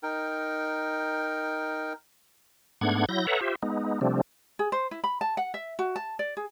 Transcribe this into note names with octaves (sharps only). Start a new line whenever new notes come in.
D#4 A#4 G5
G#2 A3 B3 D4 F#5 G#6
F#3 E4 G6 A#6
A4 B4 C#5 E5 F#5 A#5
F4 G4 C5 E5
G#3 B3 D#4
C3 F3 G3 A3 C4 D4
G#4
C5
E4
B5
A5
F#5
E5
F#4
A5
D5
G#4